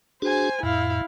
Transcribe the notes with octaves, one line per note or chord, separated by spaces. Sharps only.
D4 F#4 G#4 C5 G#5
F2 A2 E4 F5